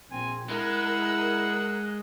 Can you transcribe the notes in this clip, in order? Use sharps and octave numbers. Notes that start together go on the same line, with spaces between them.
A#1 C4 G#5
G#3 E4 A#4 F#5 E6